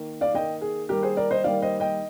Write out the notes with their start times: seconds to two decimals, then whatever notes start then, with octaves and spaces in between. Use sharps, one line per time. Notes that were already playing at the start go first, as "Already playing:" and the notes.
Already playing: D#3 A#3
0.21 D5 F5
0.34 D#3 A#3 D#5 G5
0.61 G#4
0.89 D#3 G3 A#3 G4 A#4
1.03 G#4 C5
1.17 A#4 D5
1.31 C5 D#5
1.44 D#3 G3 A#3 D5 F5
1.62 C5 D#5
1.80 D#5 G5